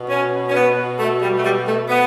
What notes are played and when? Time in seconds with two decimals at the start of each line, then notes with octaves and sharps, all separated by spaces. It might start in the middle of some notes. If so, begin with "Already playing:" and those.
Already playing: B2
0.09 C#4
0.48 C#4
0.55 B3
0.99 A3
1.22 G3
1.39 A3
1.44 G3
1.66 A3
1.89 B3